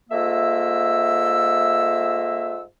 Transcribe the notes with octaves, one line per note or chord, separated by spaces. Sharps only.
G#2 A3 A#3 F4 E5 E6